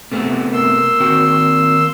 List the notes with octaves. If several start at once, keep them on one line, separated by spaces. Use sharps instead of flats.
C3 A3 B3
A#3 C6 E6
D#3 C4 F#4